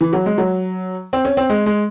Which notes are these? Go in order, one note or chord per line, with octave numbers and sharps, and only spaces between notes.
E3
F#3
G#3
F#3
C4
C#4
C4
G#3
G#3